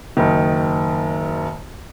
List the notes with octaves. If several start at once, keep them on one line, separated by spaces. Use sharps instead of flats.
F#1 D#3